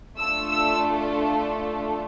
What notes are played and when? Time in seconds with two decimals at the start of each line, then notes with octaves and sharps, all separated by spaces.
0.18 A3 D4 F4 A4 E6
0.48 E6